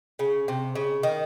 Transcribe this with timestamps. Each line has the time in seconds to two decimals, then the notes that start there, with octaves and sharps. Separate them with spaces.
0.19 C#3
0.48 C3
0.75 C#3
1.03 D#3